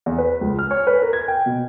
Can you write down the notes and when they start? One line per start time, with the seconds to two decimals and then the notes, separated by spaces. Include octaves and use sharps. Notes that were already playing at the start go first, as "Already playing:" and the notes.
0.06 E2
0.18 B4
0.41 C#2
0.59 F6
0.71 C#5
0.87 B4
1.02 A#4
1.13 G#6
1.28 G5
1.46 B2